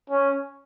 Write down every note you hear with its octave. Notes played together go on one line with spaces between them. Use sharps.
C#4